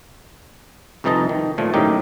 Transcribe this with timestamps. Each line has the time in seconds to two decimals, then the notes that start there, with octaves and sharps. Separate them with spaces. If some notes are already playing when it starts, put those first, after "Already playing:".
1.04 C2 F2 E3 D#4 D#5 A5
1.29 D#3
1.58 A#2 F3 A3
1.74 F#2 A2 D#3 D#4 G4